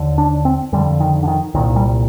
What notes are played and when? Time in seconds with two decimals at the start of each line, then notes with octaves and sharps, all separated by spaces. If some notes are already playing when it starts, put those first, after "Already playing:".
Already playing: D#2 D3
0.18 D4
0.45 C4
0.72 F2 D3 G3
1.00 D#3
1.23 D3
1.27 D#3
1.54 C2 A#2 D#3
1.76 G3